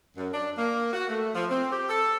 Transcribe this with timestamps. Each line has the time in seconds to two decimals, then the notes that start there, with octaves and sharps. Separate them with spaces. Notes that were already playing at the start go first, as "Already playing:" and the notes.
0.17 F#2
0.33 D4
0.58 A#3
0.93 F#4
1.08 A3
1.35 F3
1.50 C4
1.72 G4
1.89 A4